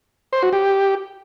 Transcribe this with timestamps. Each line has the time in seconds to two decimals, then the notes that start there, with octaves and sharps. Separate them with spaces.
0.33 C5
0.43 F#4
0.53 G4